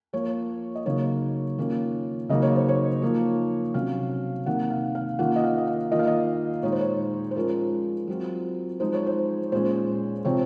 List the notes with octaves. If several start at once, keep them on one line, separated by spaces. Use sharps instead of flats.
F3 A#3 F4 C#5
D#5
C#3 F#3 A#3 D#4 C#5
D#3 A#3 C#4 F4
C#3 F#3 A#3 D#4 D#5
C#5
C5
C#5
F3 A#3 D#4
C3 F#3 C#4 F5
C3 D#3 A#3 D#4 F#5
F5
F5
D#3 A#3 C#4 F4 F#5
D#5
F5
D#5
F5
D#3 A#3 F4 D#5
F5
D#5
A#2 G#3 D#4 C#5
C5
C#5
C5
F3 G#3 C#4 F4 A#4
F#3 C4 F4
F3 G#3 D#4 C5
C#5
C5
A#2 G#3 C#4 C5
C3 F3 C4 F4 C#5